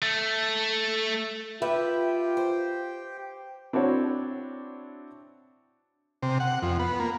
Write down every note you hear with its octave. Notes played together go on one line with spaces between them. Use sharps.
A3
F4 G4 B4 E5 G5
C5
C4 D4 E4 F#4 C#5
C3
F#5
F2
B3
A#3